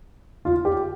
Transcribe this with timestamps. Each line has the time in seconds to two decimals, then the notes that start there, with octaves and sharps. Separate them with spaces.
0.45 F4
0.65 G4